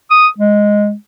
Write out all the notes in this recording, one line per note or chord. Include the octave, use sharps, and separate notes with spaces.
D#6
G#3